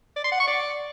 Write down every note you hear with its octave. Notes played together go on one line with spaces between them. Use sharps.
D5
C6
F#5
C#6
D5